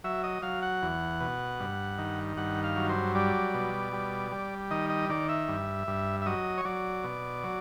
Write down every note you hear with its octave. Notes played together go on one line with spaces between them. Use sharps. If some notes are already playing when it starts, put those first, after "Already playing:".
F#3 E5
D#5
F#3 F5
F#5
E2
B2
G2
D#3
G2 F#5
F5
F#3
C5
G3 D5
B2
G3
G3
D#3 D#5
D#5
D#3 D5
E5
G2
G2
E5
F#3 D#5
C#5
F#3 D5
B2
F#3